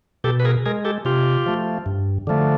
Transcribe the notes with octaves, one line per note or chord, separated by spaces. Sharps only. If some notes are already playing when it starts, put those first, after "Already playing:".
B2 G4 A4
B4
G#4 A#4
G#3 G#4 A#4
G4 A4
C3 F4 G4
F3 A3
G2
D3 F3 A3